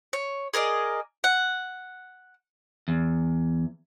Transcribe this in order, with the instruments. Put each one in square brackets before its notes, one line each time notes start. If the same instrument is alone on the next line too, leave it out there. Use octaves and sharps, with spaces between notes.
[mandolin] C#5
G#4 A#4 D5 D#5
F#5
[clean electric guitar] E2